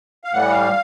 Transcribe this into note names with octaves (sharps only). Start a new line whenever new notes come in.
F5
A2 E3 G3 F#5
F5